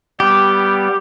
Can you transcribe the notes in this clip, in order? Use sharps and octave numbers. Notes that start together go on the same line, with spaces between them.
G3 B3 G4